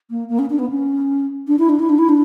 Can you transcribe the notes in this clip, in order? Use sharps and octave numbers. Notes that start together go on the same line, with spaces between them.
A#3
A#3
C#4
D4
B3
C#4
D4
E4
D4
E4
D4
E4
D4